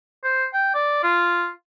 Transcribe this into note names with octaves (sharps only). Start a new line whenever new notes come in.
C5
G5
D5
F4